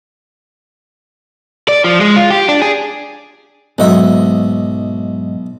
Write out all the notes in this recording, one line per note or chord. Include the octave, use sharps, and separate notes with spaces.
D5
F3
G#3
F4
G4
D4
G#4
B1 G#2 F#3 D#5 E5